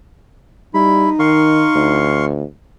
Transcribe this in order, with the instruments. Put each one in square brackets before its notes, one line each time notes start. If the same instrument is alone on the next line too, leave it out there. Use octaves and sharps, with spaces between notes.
[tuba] G3 [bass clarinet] D#4 [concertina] E4 B5
[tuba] D#3 [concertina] F5 C6 C#6
[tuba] D2